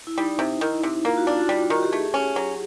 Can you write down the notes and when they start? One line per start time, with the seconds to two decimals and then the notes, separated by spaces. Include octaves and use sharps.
0.07 E4
0.18 G3 D#4
0.39 C3
0.61 D#3 E4
0.83 C3
1.05 A#3 F4
1.18 F#4
1.27 D4 F4
1.48 G3 F#4
1.70 D#3 F#4
1.83 G4
1.92 A3 G#4
2.14 C#4
2.36 F#3